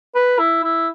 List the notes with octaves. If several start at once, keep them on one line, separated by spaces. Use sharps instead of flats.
B4
E4
E4